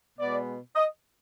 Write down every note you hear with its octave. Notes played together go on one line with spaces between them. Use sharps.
B2 G#3 B3 D5
D#5